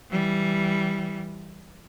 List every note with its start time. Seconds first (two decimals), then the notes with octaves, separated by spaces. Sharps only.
0.10 E3 G3